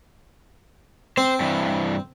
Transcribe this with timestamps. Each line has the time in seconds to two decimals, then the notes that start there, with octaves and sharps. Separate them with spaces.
1.18 C4 C5
1.40 G2 E3